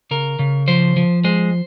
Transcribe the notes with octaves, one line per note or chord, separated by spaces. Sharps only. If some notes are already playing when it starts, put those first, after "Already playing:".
C#3 A#4
C#3
F3 C5
F3
G#3 C5